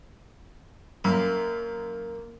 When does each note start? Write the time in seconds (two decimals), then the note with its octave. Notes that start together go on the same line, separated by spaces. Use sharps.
1.04 F#2 A#3